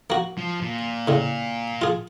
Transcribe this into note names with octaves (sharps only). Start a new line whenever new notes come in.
A#3 F#4
F3
A#2
A2 C#3
F4 G#4